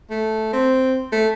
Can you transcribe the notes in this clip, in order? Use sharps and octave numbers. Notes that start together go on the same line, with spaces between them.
A3
C4
A3